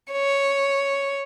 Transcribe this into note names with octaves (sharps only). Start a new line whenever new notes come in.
C#5